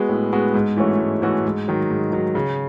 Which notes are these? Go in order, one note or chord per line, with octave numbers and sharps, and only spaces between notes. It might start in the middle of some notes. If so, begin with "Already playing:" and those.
Already playing: G#3 B3 F#4
A2
G#3 B3 F#4
G#2
E3 A3 C#4 F#4
G#2
E3 A3 C#4 F#4
G#2
D#3 F#3
G#2
D#3 F#3
C#3